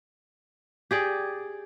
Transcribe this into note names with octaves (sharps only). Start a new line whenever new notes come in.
G4 G#4 D5